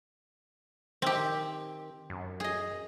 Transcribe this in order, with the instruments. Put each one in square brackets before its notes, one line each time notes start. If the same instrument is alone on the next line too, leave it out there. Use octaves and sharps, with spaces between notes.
[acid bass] D#3 [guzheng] C4 G4
[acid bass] F#2
[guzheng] G#4 D#5